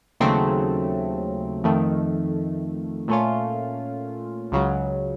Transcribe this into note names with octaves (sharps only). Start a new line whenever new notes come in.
D#2 C#3 F#3 A3 C4
F2 D#3 A3
A#2 A3 C#4 F4
C#2 C#3 F#3